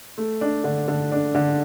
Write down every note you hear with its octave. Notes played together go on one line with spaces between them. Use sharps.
A3
D4
D3
D3
D4
D3